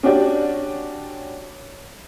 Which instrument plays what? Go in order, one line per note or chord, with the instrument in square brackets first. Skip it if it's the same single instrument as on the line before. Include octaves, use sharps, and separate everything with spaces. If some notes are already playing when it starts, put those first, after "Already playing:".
[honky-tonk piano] C#4 D4 F#4 G4 D5